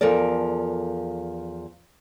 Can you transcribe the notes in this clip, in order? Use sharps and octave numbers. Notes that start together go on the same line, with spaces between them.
E2 F3 A4 A#4 D5